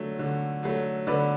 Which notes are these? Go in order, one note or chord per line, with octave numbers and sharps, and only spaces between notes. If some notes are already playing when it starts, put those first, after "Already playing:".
Already playing: D3 F#3 A3
D3
F#3 A3
D3 B4 D5